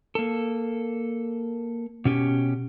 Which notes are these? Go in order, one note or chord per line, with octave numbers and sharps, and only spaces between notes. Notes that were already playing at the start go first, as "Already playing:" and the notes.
A#3 A4
B2 C#4 G4